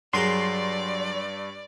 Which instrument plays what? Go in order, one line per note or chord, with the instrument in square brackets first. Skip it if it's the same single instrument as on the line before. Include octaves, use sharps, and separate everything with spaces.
[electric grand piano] G2 [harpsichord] F#3 G#4 A#4 [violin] D5 [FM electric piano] C6